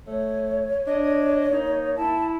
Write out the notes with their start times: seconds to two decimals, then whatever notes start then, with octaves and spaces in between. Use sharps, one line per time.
0.07 A3 C#5
0.87 D4 D#5
1.51 A#3 D#4
1.96 E4 A5